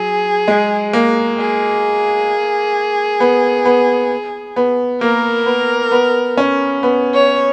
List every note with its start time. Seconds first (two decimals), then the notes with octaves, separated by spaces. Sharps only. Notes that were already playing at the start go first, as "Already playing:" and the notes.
Already playing: F#3 G#4
0.48 G#3
0.93 A#3
1.38 G#4
3.20 B3
3.65 B3
4.56 B3
5.01 A#3 A#4
5.46 B3
5.91 B3
6.37 C#4
6.83 B3
7.13 C#5